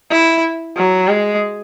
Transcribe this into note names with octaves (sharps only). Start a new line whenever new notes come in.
E4
F#3
G#3